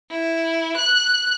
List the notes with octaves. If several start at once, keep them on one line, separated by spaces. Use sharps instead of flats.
E4
F#6